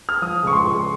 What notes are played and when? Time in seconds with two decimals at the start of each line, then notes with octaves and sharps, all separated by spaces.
0.09 F6
0.22 F3 D#6
0.43 C#2 C#6
0.53 C6
0.64 C#2